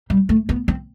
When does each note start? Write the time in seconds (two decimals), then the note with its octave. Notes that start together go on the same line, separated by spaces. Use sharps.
0.10 G3
0.29 A3
0.49 B3
0.68 C4